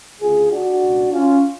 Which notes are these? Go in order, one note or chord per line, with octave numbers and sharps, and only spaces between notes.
D2 C#3 F4 G#4
D4 F#4
C#2 B2
C#4 F4